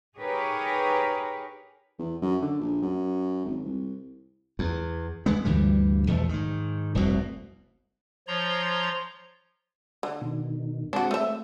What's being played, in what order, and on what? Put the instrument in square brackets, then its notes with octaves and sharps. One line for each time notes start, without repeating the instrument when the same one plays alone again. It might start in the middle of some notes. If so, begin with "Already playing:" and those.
[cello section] D#4 G4 G#4 A#4 B4 C#5
[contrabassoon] E2
F#2
D3
A#1
F#2
G#1
C2
[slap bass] E2
G#3 B3
D2 G2 E3 G3
B1 E2 F3 A3
G#2 D#3
F1 C2 G#2 B2
[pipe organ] F3 C#5 A#5 C6
[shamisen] D3
[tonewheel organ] B2 D#3
[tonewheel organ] G#3 C4 [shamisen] D4 F#4
[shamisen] A3 E5